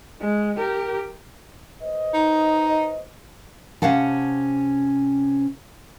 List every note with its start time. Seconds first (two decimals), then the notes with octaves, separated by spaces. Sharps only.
0.20 G#3
0.57 G4 A#4
1.82 B4 C5 D#5
2.14 D#4
3.82 C3 C#4 F5 F#5 A5